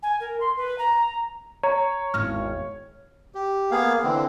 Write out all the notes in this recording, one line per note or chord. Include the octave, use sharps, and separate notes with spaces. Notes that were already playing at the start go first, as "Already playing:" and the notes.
G#5
A#4
C6
B4
A#5
C#5 A#5
G#1 E2 F6
G4
A#3 B3 G#4 F5
D3 E3 C4